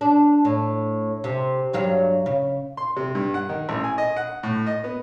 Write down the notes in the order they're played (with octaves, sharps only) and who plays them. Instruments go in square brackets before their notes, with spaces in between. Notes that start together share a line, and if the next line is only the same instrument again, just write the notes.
[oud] D4
A2
C3
G2 F#3 F5
C#3
[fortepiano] C6
C3
G2
F#5
D#3
A1
G#5
D#5
F#5
A2
D#5
B3